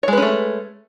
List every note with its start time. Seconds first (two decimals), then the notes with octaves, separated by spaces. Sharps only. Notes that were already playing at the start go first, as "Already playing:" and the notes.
0.03 C#5
0.08 G#3
0.13 B4
0.17 C#4
0.22 A3